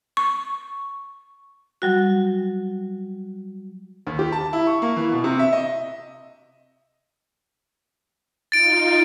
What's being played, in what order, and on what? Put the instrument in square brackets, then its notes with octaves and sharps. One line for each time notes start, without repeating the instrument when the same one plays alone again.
[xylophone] C#6
[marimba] F#3 G3 F#4
[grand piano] D#2
G4
A5
E4
C#6
A#3
E3
B2
C3
E5
D#5
[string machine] D#4 F4 [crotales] A6 D7